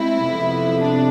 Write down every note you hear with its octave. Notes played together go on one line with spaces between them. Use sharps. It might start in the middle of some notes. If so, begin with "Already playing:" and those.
Already playing: G#3 C4 E4
F2 C3 F3 B3
D4